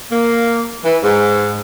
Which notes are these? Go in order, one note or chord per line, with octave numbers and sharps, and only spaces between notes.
A#3
E3
G#2